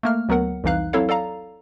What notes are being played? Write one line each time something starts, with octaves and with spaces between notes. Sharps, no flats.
A3 A#3 F6
D2 F#3 B3 A#4 F#5
C2 F2 E3 D#4 F5 F#6
F#3 C4 E4 A4 C#5 F5
A4 D5 F5 A#5